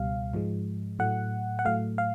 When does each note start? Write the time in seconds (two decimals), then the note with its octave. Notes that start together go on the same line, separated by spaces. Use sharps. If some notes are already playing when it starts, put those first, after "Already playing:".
Already playing: C#2 B2 G3 F5
0.34 G#2 F3 G#3
0.99 A2 F#3 A3 F#5
1.59 F#5
1.65 A2 F#3 A3 F5
1.98 F5